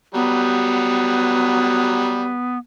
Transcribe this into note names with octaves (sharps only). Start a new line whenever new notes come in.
F#3 G3 B3